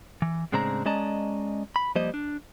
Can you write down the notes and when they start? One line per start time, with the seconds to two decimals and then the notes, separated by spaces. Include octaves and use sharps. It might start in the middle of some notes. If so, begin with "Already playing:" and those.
0.22 E3
0.52 A2 C#3 G#3 C4 D4 A#5
0.85 G#3 C#4 D5 D#5 A5 A#5
1.76 B5
1.95 F3 G3 A#3 C5 D#5
2.14 D4